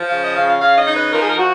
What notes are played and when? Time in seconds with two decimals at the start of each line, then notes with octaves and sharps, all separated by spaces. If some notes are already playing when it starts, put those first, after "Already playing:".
Already playing: F3
0.09 C#3 F5
0.22 D#5
0.36 C#3 F5
0.48 F5
0.60 C#3 F5
0.78 D#5
0.86 D#4
0.95 B4
1.12 F3 A#4
1.22 G#4
1.29 A#4
1.38 F3 F#4